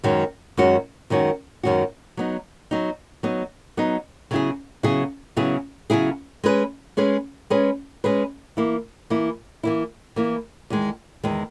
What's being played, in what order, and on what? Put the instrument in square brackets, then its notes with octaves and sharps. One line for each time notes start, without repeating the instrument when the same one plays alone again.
[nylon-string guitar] F#2 D#3 G#3 C#4 F#4
F#2 D#3 G#3 C#4 F#4
F#2 D#3 G#3 C#4 F#4
F#2 D#3 G#3 C#4 F#4
F#3 B3 D#4
F#3 B3 D#4
F#3 B3 D#4
F#3 B3 D#4
C#3 F#3 B3 E4 G#4
C#3 F#3 B3 E4 G#4
C#3 F#3 B3 E4 G#4
C#3 F#3 B3 E4 G#4
G#3 C#4 G#4 B4
G#3 C#4 G#4 B4
G#3 C#4 G#4 B4
G#3 C#4 G#4 B4
E3 A#3 E4
E3 A#3 E4
E3 A#3 E4
E3 A#3 E4
E2 D#3 G#3
E2 D#3 G#3